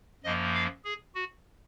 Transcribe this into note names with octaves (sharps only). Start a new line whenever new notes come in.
F#2 F3 A#3 D#5
F5
G#4
F#4